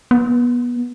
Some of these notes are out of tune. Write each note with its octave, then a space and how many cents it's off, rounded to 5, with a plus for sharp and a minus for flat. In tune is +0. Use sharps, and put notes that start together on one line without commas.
B3 -25